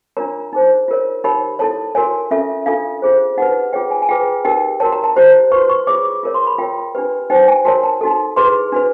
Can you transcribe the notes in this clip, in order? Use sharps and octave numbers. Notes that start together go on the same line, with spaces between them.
D4 F4 A#4 C#5 A#5
D#4 G#4 C5
F4 A#4 C#5
D#4 G4 A#4 C#5 B5
E4 A4 C#5 A5
F#4 A#4 C#5 G#5
C#4 F4 A4 E5
D4 F4 A4 F5
F4 G#4 C5
D#4 G4 B4 F#5
F4 G#4 C#5 G5
G#5
G#5
F4 G#4 B4 G5
D#4 G4 A#4 G5
F#4 A#4 C#5 A5
A#5
A5
E4 G4 C5
F#4 B4 C#6
C#6
F4 G#4 C#5 D6
D6
F4 A#4 C#5
C6
B5
F4 A#4 C#5 G5
D4 G4 B4
D#4 G4 C5 G5
G#5
F#4 A#4 C#5 A5
A5
D#4 F#4 A4
E4 G#4 B4 C6
D4 F#4 B4